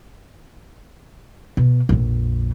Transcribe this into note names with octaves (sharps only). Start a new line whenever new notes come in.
B2
A#1 F2